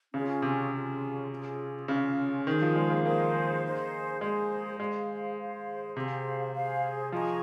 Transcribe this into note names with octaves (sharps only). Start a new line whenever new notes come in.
C#3 C#4 F4 G#4
C3
C#4 F4 G#4
C#4 F4 G#4
C#3 C#4 F4 G#4
D#3 D#4 G#4 C5
F3
G#3
A#3
A#3 D#4 G#4 C5
D#4 G#4 C5
G#3 D#4 G#4 C5
G#3 G#4 C5 F5
G#4 C5 F5
C3 G#4 C5 F5
G#4 C5 F5
F3 G#4 D#5 A#5 C#6